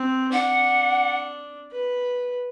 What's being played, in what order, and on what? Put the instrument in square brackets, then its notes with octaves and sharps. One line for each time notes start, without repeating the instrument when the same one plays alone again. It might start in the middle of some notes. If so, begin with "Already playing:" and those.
Already playing: [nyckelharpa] C4
[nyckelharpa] D4 [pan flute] F#5
[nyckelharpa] B4